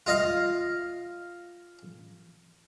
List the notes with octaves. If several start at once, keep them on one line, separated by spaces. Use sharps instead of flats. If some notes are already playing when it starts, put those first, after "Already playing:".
F4 D#5 F5